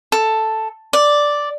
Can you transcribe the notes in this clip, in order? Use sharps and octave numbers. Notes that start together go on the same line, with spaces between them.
A4
D5